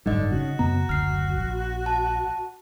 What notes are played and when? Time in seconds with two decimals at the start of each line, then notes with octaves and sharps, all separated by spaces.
0.06 F#1 G#2 D3 G3 D#4 D#5
0.32 C#3 F#4
0.59 F#2 C#3 B3 A#5
0.89 F#1 D2 F6 C7
1.38 A#1
1.86 A5